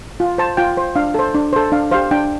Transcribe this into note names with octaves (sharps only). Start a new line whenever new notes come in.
F4
C5 A5
F4 G5
C5
D4 F5
A4 C5
D4
A4 C5
D4 F5
G4 C5 F5
D4 G5